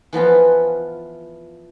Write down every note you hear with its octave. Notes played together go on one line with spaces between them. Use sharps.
E3 F3 B3 F4